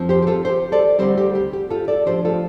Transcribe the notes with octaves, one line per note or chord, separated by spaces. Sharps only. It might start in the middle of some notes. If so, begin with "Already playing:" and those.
Already playing: F2 F3 C4
G4 C5
G4
F4 A4
G4 C5
A4 D5
D2 D3 G3 C4 G4 C5
G4
G4
G4
F4 A4
A4 D5
A2 F3 D4 G4 C5
F4 A4